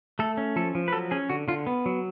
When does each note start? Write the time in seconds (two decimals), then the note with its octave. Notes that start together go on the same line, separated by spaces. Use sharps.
0.19 A3 A4
0.37 C#4
0.56 F3 A4
0.75 F3
0.88 B4
0.93 F#3 A4
1.11 C#4 G#4
1.30 D3 F#4
1.48 D3 F4
1.67 B3
1.86 F#3